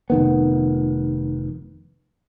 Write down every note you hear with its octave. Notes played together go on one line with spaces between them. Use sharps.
F1 D#3 B3